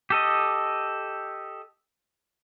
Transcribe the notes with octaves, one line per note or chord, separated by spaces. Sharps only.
G4 A4 D#5